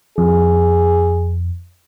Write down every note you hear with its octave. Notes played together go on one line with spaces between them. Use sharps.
F2 G#4